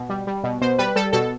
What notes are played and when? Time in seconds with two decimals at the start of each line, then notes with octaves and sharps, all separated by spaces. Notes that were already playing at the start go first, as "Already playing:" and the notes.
Already playing: B2
0.10 G3
0.27 G3
0.44 B2
0.62 B2 C5
0.78 G3 B4
0.96 G3 A4
1.13 B2 A4